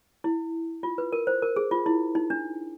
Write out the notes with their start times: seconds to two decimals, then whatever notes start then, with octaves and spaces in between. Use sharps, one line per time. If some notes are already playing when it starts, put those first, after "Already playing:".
0.24 E4
0.83 F4
0.98 B4
1.12 A#4
1.27 C5
1.42 A#4
1.56 G#4
1.71 F4
1.86 E4
2.15 D#4
2.30 D4